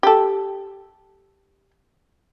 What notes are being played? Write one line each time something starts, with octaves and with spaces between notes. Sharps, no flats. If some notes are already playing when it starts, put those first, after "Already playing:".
G4 A4